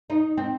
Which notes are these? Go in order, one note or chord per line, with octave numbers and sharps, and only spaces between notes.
D#4
C4